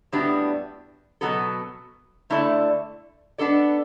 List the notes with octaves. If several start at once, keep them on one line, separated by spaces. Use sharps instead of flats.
A2 G3 B3 D4 F#4
B2 F#3 B3 F#4 A4
D3 A3 E4 A4 D5
B3 D4 A4 D5